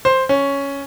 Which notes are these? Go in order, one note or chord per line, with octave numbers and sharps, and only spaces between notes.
C5
C#4